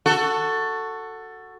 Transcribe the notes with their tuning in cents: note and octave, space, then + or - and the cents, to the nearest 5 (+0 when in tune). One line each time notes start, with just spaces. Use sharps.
F#4 +0 A4 +15